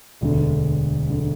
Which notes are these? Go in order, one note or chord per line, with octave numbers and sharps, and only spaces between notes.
E1 D2 D3
D3